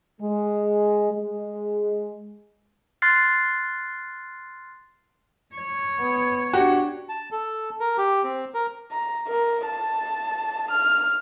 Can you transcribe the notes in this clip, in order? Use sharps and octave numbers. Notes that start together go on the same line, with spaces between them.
G#3
G#3
C6 F6 F#6 A6 C7
C#5
B3
D4 F#4 G4
A5
A4
A#4
G4
C4
A#4
A#5
A#4
A5
F6